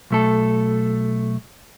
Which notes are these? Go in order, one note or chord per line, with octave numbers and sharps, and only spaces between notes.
B1 A3 A4